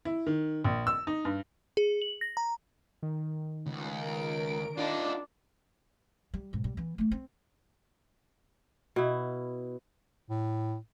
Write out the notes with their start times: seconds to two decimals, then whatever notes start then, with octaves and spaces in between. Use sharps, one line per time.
0.05 E4
0.27 D#3
0.65 A#1
0.87 E6
1.07 D#4
1.25 G2
1.77 G#4
2.02 F#7
2.21 A#6
2.37 A#5
3.03 D#3
3.66 C#2
3.99 A#4 D7
4.78 D4 D#4 F4
6.34 G3
6.53 B1 G#2
6.64 G3
6.77 E3 B3
6.98 A3 A#3
7.11 C4
8.96 B2 E4
10.30 A2